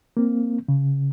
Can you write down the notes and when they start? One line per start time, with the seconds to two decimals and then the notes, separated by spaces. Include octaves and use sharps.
0.17 A#3 C4
0.68 C#3